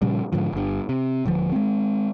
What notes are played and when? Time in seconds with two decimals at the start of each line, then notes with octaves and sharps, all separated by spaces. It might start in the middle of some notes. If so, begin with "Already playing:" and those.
0.02 A#2 C#3 F3 G3
0.32 G#2 D3 F3
0.53 G1 G2
0.89 C3
1.25 D1 D3 F3
1.52 G#3 C4